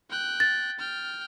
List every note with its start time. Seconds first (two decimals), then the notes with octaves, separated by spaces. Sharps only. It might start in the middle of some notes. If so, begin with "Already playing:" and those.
0.10 G5 F#6
0.40 A6
0.79 G5 F6